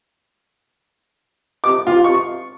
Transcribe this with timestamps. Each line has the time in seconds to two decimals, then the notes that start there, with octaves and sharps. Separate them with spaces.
1.64 D6
1.87 F4
2.04 C#6